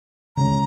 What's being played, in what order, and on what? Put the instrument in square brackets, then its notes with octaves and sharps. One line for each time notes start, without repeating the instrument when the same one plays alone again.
[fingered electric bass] C#3 G#3 C#4 [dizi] A#5